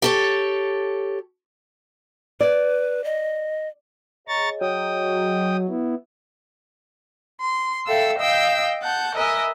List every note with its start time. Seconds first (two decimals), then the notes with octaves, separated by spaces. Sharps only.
0.02 G4 A4 C#5
2.41 B4 D5
3.04 D#5
4.28 G#4 C#5 D#5 A#5 C#6 A6
4.61 F#3 G5 D#6
5.68 B3 E4
7.41 C6
7.87 A4 E5 F5 G5 E6
8.19 D#5 F5 G5 E6 G6
8.82 F#5 A5 G6
9.15 A#4 B4 D#5 E5 G#5